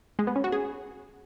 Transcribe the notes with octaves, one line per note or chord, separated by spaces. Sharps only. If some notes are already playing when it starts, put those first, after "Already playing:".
G#3
B3
C#4
F#4
G#4